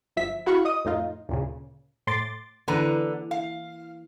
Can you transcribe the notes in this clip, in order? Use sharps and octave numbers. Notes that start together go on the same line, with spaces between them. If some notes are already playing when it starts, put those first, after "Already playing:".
G1 F3 E5 B6
E4 F#4 F5 F#5 B5 C#6
D#5 D#6
F2 A2 D#4 F4
D2 A#2 C#3
A2 C6 D6 A6
D3 E3 A#3 B4 A#5
F5